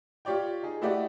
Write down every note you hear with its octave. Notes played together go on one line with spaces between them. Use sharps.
F4 G4 C#5 D5 G5
D#4 G#4
A3 E4 F#4 G4 D5 D#5